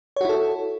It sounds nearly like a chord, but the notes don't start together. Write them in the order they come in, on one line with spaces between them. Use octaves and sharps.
C#5 F#4 E4 A4